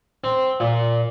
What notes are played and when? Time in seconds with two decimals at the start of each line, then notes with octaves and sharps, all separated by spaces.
0.24 C4
0.60 A#2